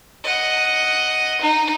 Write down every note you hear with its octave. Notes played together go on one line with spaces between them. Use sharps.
D#5 F#5
D#4